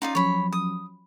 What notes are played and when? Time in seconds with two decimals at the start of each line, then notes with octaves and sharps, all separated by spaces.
0.02 C#4 D#4 F4 D5
0.15 F3 F#3 C#4 C#5 B5
0.52 D#6